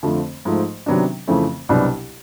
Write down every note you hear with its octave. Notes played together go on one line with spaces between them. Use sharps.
F2 D3 F3 A3 C4
G#2 F3 A3
C3 D#3 F#3 B3 D4
F2 C#3 E3 A3 C4
C2 B2 F#3 B3 D4